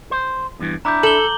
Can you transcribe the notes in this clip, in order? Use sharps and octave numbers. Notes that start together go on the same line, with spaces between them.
C5
E2 G2 E3
D4 E4 A#5 D6 G6
A4 F#7 G7